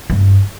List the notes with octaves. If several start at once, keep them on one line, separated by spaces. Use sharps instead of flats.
G2